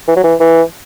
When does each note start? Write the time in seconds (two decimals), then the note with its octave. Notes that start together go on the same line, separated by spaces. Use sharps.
0.08 E3
0.16 F#3
0.24 E3
0.40 E3